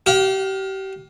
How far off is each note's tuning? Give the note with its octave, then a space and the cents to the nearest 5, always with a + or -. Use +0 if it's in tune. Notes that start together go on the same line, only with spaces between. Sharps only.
G4 -30 F5 +25